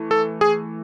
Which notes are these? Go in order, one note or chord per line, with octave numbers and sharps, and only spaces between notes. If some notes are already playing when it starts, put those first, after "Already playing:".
Already playing: E3 A3
A4
G#4